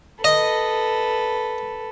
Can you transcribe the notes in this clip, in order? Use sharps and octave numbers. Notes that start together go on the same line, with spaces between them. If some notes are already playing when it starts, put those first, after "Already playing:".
A4 B4 D#5